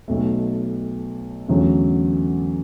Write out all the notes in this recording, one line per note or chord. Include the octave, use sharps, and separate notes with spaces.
B1 B2 A3
E2 D3 F#3 A3 C#4